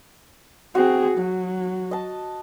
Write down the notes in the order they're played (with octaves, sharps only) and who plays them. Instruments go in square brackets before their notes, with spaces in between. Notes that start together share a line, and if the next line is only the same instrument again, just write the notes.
[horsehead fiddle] C4 G#4 [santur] F#4
[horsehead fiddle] F#3
[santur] D#5 A5